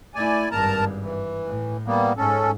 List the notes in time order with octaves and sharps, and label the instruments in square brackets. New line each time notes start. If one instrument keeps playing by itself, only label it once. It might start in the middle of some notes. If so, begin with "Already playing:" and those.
[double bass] A3 E4 [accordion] D5 G#5
[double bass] G#1 G2 [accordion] A#4 A5 A#5
[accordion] E3
[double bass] A2
[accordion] G3 A#3 B3
[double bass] G#2 [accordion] C#4 A4